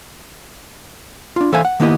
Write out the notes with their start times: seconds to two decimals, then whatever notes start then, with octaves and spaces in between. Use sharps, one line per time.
1.36 D4 F4
1.52 E3 A4 C5 E5 F5 G#5
1.65 F#5
1.80 D#3 A#3 B3 E4 G4 D#5